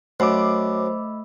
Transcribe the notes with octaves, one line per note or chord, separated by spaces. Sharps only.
F#2 A3 C5 D#5 B5 D6 E6